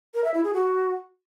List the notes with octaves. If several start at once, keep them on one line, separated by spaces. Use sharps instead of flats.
A#4
E5
E4
G#4
F#4